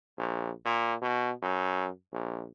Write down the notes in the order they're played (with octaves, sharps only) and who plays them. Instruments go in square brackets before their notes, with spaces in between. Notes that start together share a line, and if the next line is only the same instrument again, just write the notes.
[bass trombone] A#1
A#2
B2
F#2
A#1